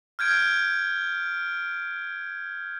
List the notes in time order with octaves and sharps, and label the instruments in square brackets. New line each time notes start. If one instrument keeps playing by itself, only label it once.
[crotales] F6 G6 G#6 D7